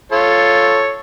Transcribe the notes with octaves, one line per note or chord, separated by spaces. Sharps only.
F4 A4 C#5